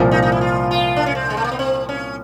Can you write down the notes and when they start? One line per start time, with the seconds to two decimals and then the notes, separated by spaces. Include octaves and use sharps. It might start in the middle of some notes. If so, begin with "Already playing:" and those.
Already playing: C2 A#2 F3
0.11 D#4
0.22 D#4
0.32 E4
0.41 F4
0.71 F4
0.96 D4
1.06 C#4
1.15 C4
1.30 G#3
1.37 A3
1.44 A#3
1.52 B3
1.59 C4
1.89 C#4